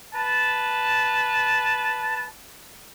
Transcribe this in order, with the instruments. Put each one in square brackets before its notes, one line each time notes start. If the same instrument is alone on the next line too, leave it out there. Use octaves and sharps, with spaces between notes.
[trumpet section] B4 A5